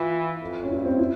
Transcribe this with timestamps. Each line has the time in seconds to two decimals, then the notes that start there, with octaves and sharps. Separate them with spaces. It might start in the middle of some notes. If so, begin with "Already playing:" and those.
Already playing: E3 F4
0.41 F2
0.63 C#4
0.70 G2 E4
0.85 C4
0.99 E4